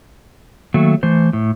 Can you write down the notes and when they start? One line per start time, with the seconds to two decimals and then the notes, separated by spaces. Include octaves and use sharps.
0.74 D#3 F#3 A3 A#3
1.03 E3 A3 C5
1.33 A2